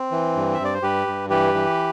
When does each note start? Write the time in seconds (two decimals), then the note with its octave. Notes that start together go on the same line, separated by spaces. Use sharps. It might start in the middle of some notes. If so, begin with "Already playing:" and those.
Already playing: C4
0.11 E3
0.36 G2
0.54 E5
0.59 G2
0.65 D5
0.74 C5
0.82 G2 G4 B4
1.07 G2
1.30 E3 G4 B4
1.54 E3